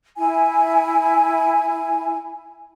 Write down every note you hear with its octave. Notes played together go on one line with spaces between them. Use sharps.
E4 G#5